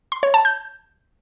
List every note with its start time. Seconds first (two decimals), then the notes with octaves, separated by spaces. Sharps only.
0.12 C6
0.23 C#5
0.34 A5
0.45 G6